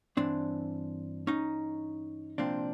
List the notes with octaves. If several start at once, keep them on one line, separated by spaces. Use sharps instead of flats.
G2 E3 C4 D4
C#4 D#4
C2 A#2 F3 C4 D4